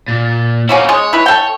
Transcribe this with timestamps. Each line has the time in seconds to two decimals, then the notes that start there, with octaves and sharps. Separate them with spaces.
0.08 A#2
0.69 F#3 A#3 C#4 D#4 E4
0.89 G#3 C#5
1.13 E4 B4
1.26 A4 G5